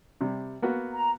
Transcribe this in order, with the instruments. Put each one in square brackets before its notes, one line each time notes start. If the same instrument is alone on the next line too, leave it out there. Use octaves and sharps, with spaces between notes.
[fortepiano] C3 G3
A#3 B3 F#4
[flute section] A#5